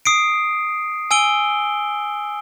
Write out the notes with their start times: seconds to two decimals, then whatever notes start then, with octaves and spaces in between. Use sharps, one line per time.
0.05 D#6 C7 D7
1.11 G#5 E6 D7 G7